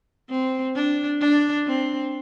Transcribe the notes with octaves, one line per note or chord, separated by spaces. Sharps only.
C4
D4
D4
C4